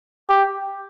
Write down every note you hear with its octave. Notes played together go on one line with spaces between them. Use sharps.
G4